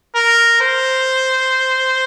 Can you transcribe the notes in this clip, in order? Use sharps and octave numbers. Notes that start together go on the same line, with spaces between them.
A#4
C5